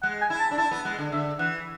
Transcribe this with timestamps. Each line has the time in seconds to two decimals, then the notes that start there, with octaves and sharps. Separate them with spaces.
0.03 G#3 F#5
0.21 G#5
0.30 E4
0.39 A5
0.51 D4
0.58 E4 A5
0.71 B3
0.85 G#3 F#5
0.99 D3
1.12 D3 E5
1.39 E3 F#5